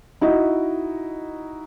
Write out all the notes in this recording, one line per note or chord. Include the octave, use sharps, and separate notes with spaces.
D#4 E4 F#4 D#5